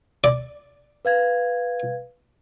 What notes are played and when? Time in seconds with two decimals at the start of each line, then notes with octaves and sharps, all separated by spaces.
0.24 D5
1.05 B4 F5 G#6